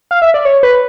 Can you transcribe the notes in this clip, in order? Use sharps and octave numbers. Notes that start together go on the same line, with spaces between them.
F5
E5
D5
C#5
B4